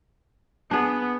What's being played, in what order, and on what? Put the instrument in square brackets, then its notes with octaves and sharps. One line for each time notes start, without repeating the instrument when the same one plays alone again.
[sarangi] B3 [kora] D4 G#4